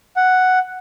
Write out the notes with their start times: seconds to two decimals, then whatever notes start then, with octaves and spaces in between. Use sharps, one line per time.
0.16 F#5